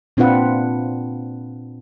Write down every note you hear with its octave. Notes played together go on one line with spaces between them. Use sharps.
A#2 C4 D4 F4 B4 F#5